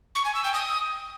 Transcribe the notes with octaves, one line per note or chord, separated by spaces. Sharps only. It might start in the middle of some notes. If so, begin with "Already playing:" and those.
C#6
G#5
E6
G5
D#6